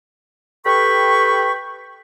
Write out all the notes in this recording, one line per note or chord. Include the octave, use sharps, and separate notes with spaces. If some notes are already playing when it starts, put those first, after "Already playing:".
G4 A4 B4 G5 B5 C#6